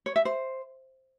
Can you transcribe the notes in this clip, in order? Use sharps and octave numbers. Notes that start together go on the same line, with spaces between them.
C#5
E5
C5